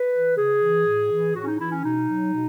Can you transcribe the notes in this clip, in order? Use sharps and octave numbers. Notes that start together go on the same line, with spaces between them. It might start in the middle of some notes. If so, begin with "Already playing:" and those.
Already playing: B4
E3
C#3 G#4
E3
A2
E3
A2 F#4
C#4
D#4
E3 E4
C#4
B2 D#4
F#3
B2